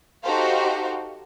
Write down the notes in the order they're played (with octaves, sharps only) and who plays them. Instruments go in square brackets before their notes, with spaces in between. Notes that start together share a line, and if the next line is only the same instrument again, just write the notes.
[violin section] D#4 F#4 G4 A4 C5 F5